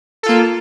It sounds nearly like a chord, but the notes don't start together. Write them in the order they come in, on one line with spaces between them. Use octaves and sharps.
A4 F4 A#3